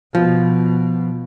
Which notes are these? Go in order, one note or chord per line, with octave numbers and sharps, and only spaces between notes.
B2 F3